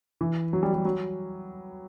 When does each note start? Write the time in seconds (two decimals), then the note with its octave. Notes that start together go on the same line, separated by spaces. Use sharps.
0.21 E3
0.53 F#3
0.63 G3
0.73 G3
0.85 F#3